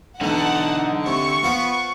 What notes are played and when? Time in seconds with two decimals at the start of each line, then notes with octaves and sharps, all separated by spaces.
0.21 B1 D3 E3 D#4 F#5 A5
1.06 C3 C#6
1.43 B3 F4 C5 F#5